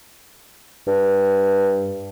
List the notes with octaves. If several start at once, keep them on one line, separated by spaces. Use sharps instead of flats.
G2